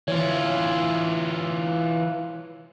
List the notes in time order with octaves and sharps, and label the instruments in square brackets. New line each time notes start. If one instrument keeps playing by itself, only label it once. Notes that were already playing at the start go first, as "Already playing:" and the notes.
[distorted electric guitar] E3 F4 [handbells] C#5